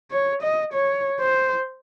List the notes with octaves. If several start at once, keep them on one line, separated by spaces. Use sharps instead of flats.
C#5
D#5
C#5
C5